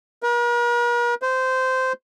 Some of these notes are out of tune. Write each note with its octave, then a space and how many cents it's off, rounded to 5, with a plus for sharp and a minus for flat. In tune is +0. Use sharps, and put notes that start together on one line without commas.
A#4 +45
C5 -15